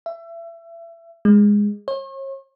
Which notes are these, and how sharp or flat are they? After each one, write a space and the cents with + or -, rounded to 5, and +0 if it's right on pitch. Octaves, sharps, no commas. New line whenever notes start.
E5 +30
G#3 -10
C#5 -40